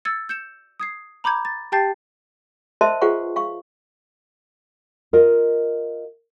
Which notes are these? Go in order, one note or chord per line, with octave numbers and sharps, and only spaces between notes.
E6 G#6 A6 C#7
G6 C#7 E7
D#6 G#6 C7
A#5 B5 D6 G6 G#6
A6
G4 G5 A5 G6 A6 C7
A#4 C5 D#5 E5 A5 C6
F4 G#4 B4 C5 F#5 C#6
F5 C#6
F4 A#4 D#5